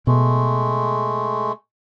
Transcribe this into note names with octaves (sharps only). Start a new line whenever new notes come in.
B2 G#3 A3